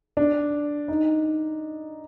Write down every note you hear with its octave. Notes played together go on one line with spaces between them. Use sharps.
D4
D#4